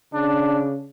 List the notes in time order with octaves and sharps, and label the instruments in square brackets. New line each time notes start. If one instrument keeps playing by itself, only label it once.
[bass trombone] C#3 [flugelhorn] D4